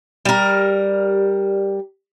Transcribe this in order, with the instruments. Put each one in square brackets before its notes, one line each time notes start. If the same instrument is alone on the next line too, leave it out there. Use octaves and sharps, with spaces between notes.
[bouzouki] G3 A#4